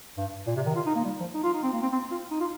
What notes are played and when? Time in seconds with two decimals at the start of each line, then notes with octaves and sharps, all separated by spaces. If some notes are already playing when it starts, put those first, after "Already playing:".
0.18 G2
0.47 A#2
0.56 C3
0.66 D#3
0.76 F4
0.86 D#4
0.95 A#3
1.05 G3
1.20 F3
1.34 D#4
1.44 F4
1.53 D#4
1.63 C4
1.73 A#3
1.82 C4
1.92 C4
2.11 F4
2.31 D#4
2.40 F4